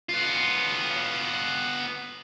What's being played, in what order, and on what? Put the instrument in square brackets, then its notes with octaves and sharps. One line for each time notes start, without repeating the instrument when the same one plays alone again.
[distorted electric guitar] B3 F4